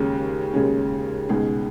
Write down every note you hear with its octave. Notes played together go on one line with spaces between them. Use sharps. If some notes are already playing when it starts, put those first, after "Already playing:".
Already playing: D#2 C#3 G#3 C#4
D#2 C#3 G#3 C#4
C#2 B2 G#3 D#4 G#4